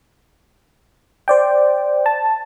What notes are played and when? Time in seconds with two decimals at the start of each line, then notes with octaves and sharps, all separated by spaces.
1.28 C5 D5 G5
2.06 A5